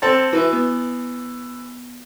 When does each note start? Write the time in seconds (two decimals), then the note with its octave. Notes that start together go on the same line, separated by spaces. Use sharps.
0.02 C4 A4 A5
0.33 E3 F#4 B4 E5
0.53 B3